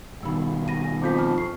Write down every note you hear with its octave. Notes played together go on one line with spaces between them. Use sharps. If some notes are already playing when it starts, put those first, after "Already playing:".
B2 D#3 G3 B5 E6
B5 A#6 D#7
G#5
F2 D6 G6 B6
G#5 A5 F6
C#6 C7